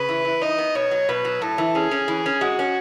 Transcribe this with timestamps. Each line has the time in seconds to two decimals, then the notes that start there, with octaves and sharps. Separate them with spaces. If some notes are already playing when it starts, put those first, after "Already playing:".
Already playing: C#3 B4
0.09 E3
0.25 E3
0.41 D#4 D#5
0.58 B3
0.75 B2 C#5
0.91 F#3
1.09 B2 B4
1.25 F#3
1.41 A2 A4
1.58 E3
1.75 C#4 G#4
1.91 C#4
2.08 E3
2.26 C#4
2.41 G#3 F#4
2.59 C#4